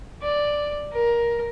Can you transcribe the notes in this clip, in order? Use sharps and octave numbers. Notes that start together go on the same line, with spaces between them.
D5
A#4